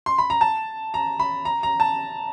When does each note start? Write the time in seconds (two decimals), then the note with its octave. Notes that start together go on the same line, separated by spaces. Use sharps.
0.06 C6
0.18 B5
0.30 A#5
0.41 A5
0.94 A#5
1.20 B5
1.45 A#5
1.63 A#5
1.80 A5